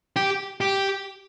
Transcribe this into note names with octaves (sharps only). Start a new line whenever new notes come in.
G4
G4